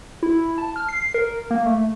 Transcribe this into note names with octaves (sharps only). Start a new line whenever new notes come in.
E4
A5
F6
C7
A#4
A#3
A3